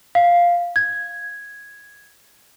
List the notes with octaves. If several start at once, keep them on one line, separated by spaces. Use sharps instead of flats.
F5
G#6